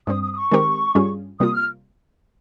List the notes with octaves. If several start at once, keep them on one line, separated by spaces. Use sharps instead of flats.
G2 G3 C4 D#6
D#6
D#6
C#6
D#3 G#3 C4 G4 A#4
G2 G3 C#4 F4 G#4
C3 G3 A#3 F4 D#6
F6